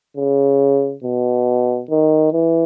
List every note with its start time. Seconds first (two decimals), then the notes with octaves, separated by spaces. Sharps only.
0.17 C#3
1.04 B2
1.90 D#3
2.33 E3